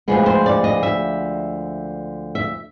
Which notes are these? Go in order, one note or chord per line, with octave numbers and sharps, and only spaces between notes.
D2 D3 F3 G#3 B3
C5
D5
D#5
E5
E5